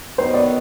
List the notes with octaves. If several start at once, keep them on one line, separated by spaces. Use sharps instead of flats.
D#3 F#3 B3 D#4 C5
D5